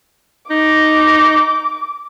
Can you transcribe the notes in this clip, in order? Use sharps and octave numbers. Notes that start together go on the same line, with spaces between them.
D#4 D6